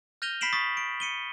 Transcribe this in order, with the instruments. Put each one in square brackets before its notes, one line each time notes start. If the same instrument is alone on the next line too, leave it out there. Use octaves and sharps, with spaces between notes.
[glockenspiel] F6 G6 A#6 D#7 F7 G7
B5 B6 C7 D7 E7 F#7
C#6 D#6 A6 B6
D7
C#7 D#7 G7